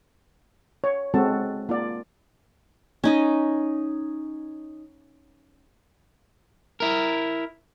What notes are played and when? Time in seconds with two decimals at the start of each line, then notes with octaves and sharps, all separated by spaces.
0.84 C#5
1.14 G#3 C4 F#4 A4 A5
1.69 A#3 F4 D5
3.04 C#4 D#4 D#5
6.80 E4 A#4